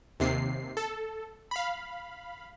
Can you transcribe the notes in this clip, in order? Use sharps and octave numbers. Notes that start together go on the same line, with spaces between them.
D#2 C3 C7
A4
F5 B5